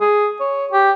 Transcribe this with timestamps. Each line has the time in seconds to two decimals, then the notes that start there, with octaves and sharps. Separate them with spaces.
0.01 G#4
0.40 C#5
0.72 G4